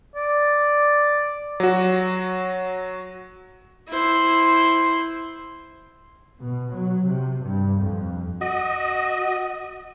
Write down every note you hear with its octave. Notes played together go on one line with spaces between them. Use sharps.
D5
F#3 F#4
E4 C5
B2
F#3
C3
G2
F2
F#4 D#5